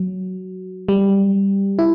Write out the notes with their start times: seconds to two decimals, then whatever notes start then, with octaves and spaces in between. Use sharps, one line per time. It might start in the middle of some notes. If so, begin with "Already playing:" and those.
Already playing: F#3
0.89 G3
1.79 E4